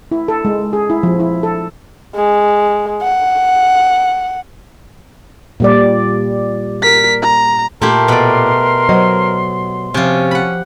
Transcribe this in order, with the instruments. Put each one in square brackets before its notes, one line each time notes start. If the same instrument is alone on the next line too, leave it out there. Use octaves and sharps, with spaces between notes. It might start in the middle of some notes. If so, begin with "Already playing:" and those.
[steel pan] E4
A4
G#3
G#4
E4
F3
E4
A4
[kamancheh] G#3
F#5
[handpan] A#2 G3 D5
[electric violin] A#4 B6
A#5
[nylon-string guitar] A#2 [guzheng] A3 E4 G4 [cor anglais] A#4 [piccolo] C6
[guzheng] B2 D5
[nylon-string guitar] F#3 C5 D#5
[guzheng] C3 F4 [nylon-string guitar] F3 G#5 [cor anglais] C#4
[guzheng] F#5 B5